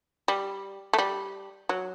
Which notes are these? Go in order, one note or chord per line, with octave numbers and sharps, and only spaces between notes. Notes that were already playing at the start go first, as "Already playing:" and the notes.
G3
A3
G3
F#3